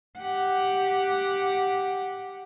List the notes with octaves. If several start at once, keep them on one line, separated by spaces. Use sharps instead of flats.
G4 F#5